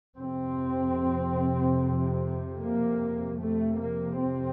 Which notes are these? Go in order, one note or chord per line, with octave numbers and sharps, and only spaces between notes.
F2 C3 C4
A#3
F2 C3 A3
A#3
C4